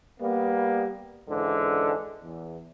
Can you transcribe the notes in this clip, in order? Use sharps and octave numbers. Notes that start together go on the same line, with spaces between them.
G3 A#3 B3
C#2 G#2 D3 E3
E2